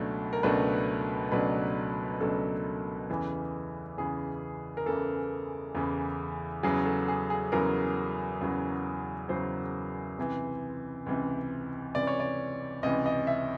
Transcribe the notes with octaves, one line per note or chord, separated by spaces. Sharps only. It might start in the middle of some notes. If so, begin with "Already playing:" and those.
Already playing: C#2 B2 F#3 A3 D4
A#4
C#2 B2 F#3 A3 D4 B4
C#2 B2 F#3 A3 D4 B4
C#2 B2 F#3 A3 D4 A4
E2 C#3 E3
E2 C#3 E3 G#4
A#4
E2 C#3 E3 A4
E2 C#3 E3
E2 C#3 F#3 G#4
A4
G#4
G#4
E2 C#3 F#3 A#4
E2 C#3 F#3
E2 C#3 F#3 C5
C#2 C3 E3
C#2 C3 E3
C#2 C3 E3 D5
C#5
D5
C#2 C3 E3 D#5
D#5
E5